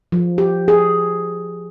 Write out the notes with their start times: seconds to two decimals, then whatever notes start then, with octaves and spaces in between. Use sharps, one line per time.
0.12 F3
0.38 G4
0.68 G#4